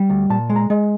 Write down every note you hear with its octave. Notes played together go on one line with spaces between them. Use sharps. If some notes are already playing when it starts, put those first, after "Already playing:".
Already playing: G3
D2
A#2 A5
G#3
A#5
G#3